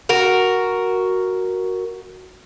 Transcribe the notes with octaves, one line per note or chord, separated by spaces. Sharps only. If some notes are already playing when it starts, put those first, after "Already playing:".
F#4 A#4